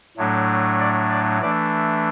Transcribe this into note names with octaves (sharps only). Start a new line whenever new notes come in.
A2 F#3 A3 D4
D5
D5
E3 A3 D4 D5